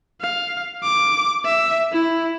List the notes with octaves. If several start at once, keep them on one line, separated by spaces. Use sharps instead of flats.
F5
D6
E5
E4